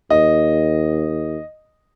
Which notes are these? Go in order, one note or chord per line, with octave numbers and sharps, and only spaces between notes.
D#2 D#5